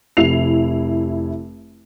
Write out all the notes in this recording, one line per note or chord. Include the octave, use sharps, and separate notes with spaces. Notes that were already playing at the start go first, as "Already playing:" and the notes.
F1 E4 C7 F7